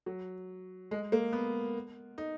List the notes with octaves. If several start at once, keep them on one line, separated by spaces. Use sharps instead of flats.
F#3
G#3
A#3
B3
D#4